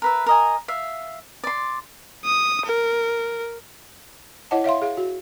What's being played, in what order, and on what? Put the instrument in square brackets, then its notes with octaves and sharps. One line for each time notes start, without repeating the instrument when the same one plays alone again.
[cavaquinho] A#4 B4 E5
A#4 D#5 G#5
E5 F5
D5 C6
[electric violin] D#6
A#4
[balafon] E4 C#5 D#5 F#5 A5
C#5 E5 F5 C6
G#4 F5
F#4